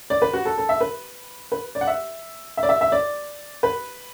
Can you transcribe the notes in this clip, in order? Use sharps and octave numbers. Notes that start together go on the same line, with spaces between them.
D5
B4
F#4
A4
A4
E5
B4
B4
D5
F#5
E5
E5
D5
E5
E5
D5
B4